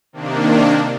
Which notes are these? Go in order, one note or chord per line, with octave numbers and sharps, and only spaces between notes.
C3 D#3 A#3 D4